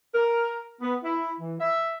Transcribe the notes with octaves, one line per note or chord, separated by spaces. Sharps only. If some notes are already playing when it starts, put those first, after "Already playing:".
A#4
B3
E4
E3
E5